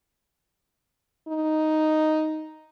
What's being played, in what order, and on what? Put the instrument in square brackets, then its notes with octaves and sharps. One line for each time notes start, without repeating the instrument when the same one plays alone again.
[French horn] D#4